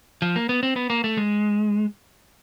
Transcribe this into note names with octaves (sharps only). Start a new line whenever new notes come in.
F3
A#3
B3
C4
B3
A#3
A3
G#3